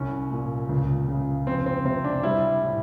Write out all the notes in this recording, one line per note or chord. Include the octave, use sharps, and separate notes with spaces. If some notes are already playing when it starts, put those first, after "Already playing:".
Already playing: C2 C#4
A#2
C#2
C#3
F2 C4
C4
C3 C4
D4
G3 E4
A2